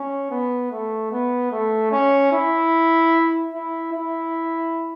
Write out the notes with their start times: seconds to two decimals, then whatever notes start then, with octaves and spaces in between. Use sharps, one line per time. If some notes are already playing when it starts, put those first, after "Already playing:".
Already playing: C#4
0.31 B3
0.71 A3
1.11 B3
1.52 A3
1.92 C#4
2.32 E4
3.53 E4
3.93 E4